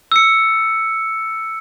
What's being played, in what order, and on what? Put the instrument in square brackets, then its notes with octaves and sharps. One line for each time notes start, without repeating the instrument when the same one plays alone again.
[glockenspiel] E6 C#7